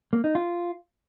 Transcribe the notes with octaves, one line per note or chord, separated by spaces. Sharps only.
A#3
D#4
F4